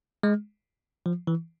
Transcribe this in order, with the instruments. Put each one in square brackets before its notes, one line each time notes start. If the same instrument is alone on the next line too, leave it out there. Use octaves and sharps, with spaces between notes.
[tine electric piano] G#3
F3
E3